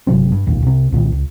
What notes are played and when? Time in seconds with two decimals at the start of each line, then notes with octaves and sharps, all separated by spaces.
0.07 G1 C3 F#3 C4
0.32 G2
0.46 E1 A#1 D#2
0.63 C2 C3
0.92 C2 A#2 D3 D#3
1.12 C#2